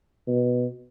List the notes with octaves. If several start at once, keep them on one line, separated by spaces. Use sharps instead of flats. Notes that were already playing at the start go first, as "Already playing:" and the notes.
B2